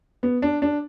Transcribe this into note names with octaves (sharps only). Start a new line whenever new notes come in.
B3
D4
D4